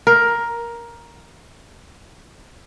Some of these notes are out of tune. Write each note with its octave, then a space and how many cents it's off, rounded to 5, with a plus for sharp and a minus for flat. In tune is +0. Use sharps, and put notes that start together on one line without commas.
A#4 +10